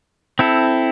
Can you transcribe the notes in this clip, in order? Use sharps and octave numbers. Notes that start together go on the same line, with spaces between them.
C4 E4 A4